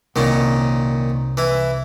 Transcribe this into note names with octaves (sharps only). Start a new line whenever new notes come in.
C2 A#2 D#3 C#4
E3 E4